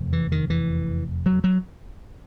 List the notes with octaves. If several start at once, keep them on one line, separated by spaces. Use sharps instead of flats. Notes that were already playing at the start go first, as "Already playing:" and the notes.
Already playing: F1 E2
E3
D#3
E3
F#3
F#3